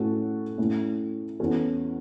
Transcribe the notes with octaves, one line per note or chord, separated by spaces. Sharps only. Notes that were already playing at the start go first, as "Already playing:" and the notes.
Already playing: A2 A3 C#4 F#4 A4
A2 A3 C#4
E2 E3 C#4 F#4 A4